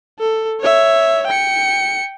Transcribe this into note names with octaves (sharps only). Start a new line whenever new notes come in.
A4
C#5 E5
G5 C#7